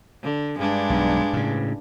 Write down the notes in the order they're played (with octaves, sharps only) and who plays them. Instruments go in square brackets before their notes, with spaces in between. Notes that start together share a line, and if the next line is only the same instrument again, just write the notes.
[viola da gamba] D3
G2 G#3 D4
[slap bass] B1
A2 C#3